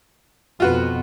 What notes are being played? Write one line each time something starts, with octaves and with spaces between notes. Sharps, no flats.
F2 B2 F4 F#4 B4